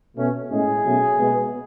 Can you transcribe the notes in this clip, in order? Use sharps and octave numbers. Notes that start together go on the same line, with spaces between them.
B2 A3 C#4
A2 G#3 C#4 G#4
B2 F#3 A3 C#4
B2 G#3 B3